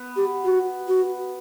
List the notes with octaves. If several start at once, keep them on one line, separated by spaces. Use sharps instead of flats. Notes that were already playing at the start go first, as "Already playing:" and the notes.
Already playing: B3
G4
F#4
F#4